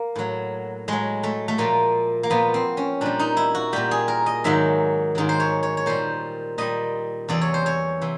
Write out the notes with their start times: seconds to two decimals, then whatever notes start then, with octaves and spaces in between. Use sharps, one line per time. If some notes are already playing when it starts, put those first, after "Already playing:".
Already playing: A#3
0.16 A2 F#3
0.88 A2 F#3 G#3
1.23 A3
1.48 A3
1.58 A#2 F3 A#3
2.23 A#3
2.30 A#2 F3 B3
2.54 C4
2.77 C#4
3.01 A#2 G3 D4
3.19 D#4
3.37 E4
3.55 F#4
3.73 A#2 G3 G4
3.91 G#4
4.08 A#4
4.26 D#5
4.44 G#2 D#3 F#3 E5
5.15 G#2 D#3 F#3
5.29 C5
5.40 C#5
5.63 C#5
5.77 C#5
5.86 A#2 G3 C5
6.58 A#2 G3 D#5
7.29 E2 C3 E3 D5
7.41 C#5
7.54 C5
7.66 C#5
8.01 C3 E3